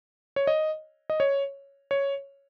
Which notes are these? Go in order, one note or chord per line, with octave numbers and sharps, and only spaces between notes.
C#5
D#5
D#5
C#5
C#5